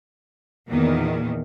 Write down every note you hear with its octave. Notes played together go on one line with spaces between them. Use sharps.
E2 A#2 D#3